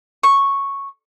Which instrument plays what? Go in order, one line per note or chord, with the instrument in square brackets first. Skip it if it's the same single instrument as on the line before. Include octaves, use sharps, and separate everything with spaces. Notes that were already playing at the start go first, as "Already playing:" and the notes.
[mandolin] C#6